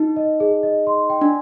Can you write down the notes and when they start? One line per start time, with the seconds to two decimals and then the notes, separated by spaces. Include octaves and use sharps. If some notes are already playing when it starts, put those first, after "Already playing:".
Already playing: D#4
0.16 D#5
0.40 G#4
0.63 D#5
0.87 C6
1.10 G5
1.21 D4